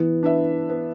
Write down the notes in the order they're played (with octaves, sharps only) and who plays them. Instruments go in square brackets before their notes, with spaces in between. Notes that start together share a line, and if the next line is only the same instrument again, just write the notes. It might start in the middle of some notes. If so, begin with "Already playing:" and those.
Already playing: [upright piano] E3 [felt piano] B3
[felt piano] D4 B4 E5
B3